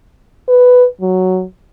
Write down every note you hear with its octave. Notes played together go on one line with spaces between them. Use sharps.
B4
F#3